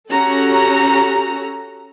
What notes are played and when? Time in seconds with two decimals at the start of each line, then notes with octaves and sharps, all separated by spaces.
0.11 C#4 F#4 G4 A4 A#5